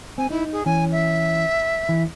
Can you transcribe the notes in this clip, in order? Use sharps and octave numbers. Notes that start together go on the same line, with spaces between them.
C4 G#5
D#4 E4
G#4
E3 C#4 G#5
E5
E3